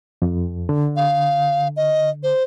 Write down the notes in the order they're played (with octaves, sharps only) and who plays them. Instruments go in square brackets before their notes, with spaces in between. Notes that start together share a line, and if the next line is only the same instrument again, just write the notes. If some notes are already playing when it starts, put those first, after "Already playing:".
[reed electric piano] F2
D3
[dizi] F5
D#5
C5